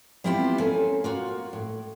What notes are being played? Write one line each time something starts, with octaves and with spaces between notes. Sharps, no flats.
G3 B3 C4 E4 F4 G4
A#3 C4 C#4 A4 G#5
A#3 F4 F#4
A2